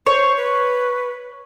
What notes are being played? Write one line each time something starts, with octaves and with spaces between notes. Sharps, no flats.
C5 C#5
B4